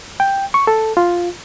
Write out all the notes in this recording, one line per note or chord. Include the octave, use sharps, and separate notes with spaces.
G5
C#6
A4
F4